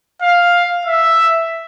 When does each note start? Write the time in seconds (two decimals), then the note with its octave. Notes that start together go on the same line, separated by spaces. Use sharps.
0.22 F5
0.86 E5